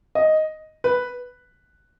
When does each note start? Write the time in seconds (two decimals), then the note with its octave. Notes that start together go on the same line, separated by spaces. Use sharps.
0.15 D#5
0.84 B4